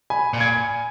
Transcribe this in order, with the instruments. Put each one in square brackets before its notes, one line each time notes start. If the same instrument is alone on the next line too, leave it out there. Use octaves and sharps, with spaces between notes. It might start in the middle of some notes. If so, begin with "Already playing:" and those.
[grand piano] G#5 B5
[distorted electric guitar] A#2
[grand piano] G#6